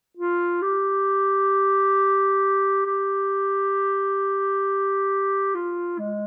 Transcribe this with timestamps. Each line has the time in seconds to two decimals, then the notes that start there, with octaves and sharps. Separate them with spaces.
0.17 F4
0.62 G4
2.86 G4
5.55 F4
5.99 G#3